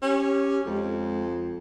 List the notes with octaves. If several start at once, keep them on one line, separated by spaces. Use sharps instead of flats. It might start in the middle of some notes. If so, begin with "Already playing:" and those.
C#4 G4
F2 G#3